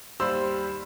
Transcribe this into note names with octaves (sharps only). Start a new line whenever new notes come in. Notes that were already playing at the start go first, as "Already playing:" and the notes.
D#2 G3 C5 B5 C6 E6